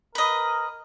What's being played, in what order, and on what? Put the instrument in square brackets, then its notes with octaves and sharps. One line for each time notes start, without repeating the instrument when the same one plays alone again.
[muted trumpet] A#4 [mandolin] B4 D#5